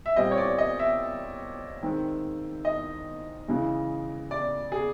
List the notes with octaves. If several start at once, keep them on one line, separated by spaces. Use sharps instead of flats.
E5
A#2 G3 C4 D#5
C#5
D5
D#5
E5
D#3 G#3 C4
D#5
C#3 E3 G#3
D5
G#4